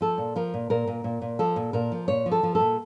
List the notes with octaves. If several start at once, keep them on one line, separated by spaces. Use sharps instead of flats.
F3 A4
A#2
F3 A#4
A#2
A#2 A#4
A#2
A#2
A#2
F3 A4
A#2
A#2 A#4
F3
A#2 C#5
F3
A4
F3
A4
A#2